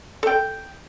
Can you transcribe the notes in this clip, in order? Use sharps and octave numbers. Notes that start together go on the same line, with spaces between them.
A4 G5